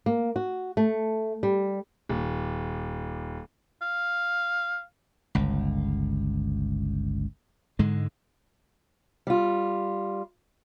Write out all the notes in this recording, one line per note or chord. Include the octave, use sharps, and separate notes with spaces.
A#3
F#4
A3
G3
D#1
F5
G1 C#2
G#2 D3 G#3
G3 F4